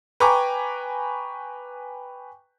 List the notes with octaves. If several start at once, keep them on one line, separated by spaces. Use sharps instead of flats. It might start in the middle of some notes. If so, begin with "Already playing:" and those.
B4 G5 G#5 A#5 C#6 D6